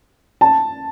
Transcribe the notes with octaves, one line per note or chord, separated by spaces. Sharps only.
A5